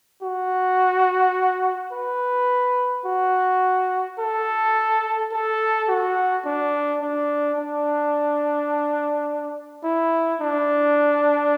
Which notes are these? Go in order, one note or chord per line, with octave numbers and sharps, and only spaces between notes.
F#4
B4
F#4
A4
A4
F#4
D4
D4
D4
E4
D4